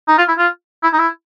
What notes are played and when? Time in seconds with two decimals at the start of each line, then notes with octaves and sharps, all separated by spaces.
0.08 D#4
0.18 F4
0.28 E4
0.38 F4
0.83 E4
0.93 D#4
0.98 E4